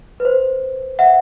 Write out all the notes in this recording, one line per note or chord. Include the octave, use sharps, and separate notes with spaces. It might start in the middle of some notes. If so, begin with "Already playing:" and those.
B4
C5
E5 F#5